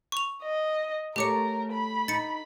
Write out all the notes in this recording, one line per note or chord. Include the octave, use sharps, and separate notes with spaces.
C#6 F7
D#5
A3 G4 A4 A#4 C#5 D6 C#7
B5
D#4 A6 C#7